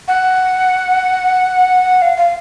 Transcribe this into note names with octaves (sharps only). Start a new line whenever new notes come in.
F#5
F5
F5